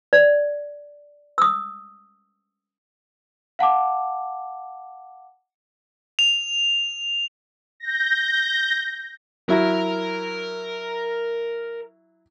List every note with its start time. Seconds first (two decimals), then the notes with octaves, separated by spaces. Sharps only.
0.13 D5
1.38 D#6 E6
3.59 F5 F#5 A5 D6
6.19 F7
7.80 G6 A#6
9.49 F#3 E4 A#4 A#5